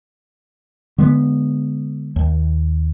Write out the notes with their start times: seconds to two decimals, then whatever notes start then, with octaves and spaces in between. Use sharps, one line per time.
0.98 D3 G#3 B3
2.16 D#2